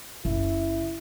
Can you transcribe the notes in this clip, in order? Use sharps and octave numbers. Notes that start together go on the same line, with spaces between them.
F#1 E4